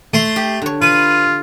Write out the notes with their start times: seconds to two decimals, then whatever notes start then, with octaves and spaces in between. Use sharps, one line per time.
0.14 A3 C6
0.36 G4
0.62 D3 C#5
0.82 F4 B4